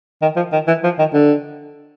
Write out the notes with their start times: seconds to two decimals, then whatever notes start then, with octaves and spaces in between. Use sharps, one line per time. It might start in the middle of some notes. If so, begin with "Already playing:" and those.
0.22 D#3
0.36 F3
0.52 D#3
0.67 E3
0.84 F3
0.99 D#3
1.14 D3